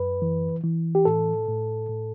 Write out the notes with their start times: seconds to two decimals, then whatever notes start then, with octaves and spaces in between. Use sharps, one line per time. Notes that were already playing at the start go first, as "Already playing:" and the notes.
Already playing: F#2 B4
0.22 E3
0.64 E3
0.95 G4
1.05 A2 A4
1.48 A2
1.89 A2